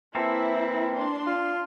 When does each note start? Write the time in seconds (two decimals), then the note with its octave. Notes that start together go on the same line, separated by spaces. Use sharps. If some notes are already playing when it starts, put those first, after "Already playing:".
0.15 E3 A#3 C4 E4 A4
0.94 D4 C6
1.26 F4